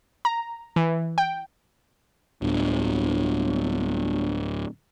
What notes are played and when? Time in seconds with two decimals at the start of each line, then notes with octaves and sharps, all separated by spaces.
0.25 A#5
0.76 E3
1.18 G5
2.42 D1 G1